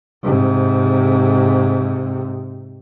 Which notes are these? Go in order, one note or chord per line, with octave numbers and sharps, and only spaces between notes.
G#2 C3